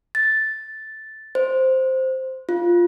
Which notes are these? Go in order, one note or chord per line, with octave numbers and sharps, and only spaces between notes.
A6
C5
F4